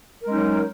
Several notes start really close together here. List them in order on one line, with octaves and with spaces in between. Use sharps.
A#4 G#3 C#4 D#4 F#3